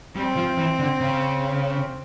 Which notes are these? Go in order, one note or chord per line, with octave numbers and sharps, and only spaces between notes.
G3 C4
F3
E3
D3
C#3